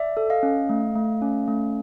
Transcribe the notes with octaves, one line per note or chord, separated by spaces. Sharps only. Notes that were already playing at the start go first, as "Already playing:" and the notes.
Already playing: D5 E5
A4
D#5 F5
C#4
A3
A3
C#4
A3